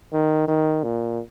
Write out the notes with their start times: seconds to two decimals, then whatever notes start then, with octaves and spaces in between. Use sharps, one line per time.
0.13 D#3
0.48 D#3
0.84 A#2